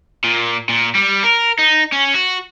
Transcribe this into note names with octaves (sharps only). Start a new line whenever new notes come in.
A#2
A#2
G3
A#4
D#4
C#4
F#4